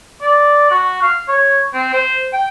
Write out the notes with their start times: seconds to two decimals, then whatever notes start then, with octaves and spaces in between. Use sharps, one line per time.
0.22 D5
0.71 F#4
1.03 F5
1.28 C#5
1.74 C4
1.93 C5
2.33 G5